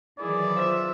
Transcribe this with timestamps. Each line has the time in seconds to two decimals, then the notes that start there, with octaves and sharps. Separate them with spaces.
0.19 D#3 E3 F#3 E4 G#4 D5
0.56 F4 C5 E5